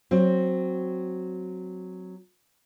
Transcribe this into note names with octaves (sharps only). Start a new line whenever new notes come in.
F#3 C4